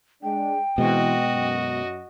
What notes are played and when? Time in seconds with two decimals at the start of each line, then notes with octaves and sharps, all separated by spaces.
0.23 G#3 D4 G5
0.78 B2 E3 G#3 C4 F#4 D#5
1.33 F#2